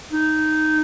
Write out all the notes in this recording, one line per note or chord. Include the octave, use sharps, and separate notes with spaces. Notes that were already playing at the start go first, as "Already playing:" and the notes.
D#4